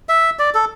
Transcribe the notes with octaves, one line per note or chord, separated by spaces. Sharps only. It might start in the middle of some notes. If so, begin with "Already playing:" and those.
E5
D5
A4